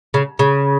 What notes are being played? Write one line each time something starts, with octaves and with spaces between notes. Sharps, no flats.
C#3
C#3